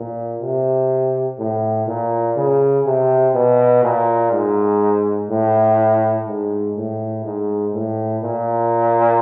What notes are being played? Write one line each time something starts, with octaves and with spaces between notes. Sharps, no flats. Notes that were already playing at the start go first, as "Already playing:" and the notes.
Already playing: A#2
C3
A2
A#2
C#3
C3
B2
A#2
G#2
A2
G#2
A2
G#2
A2
A#2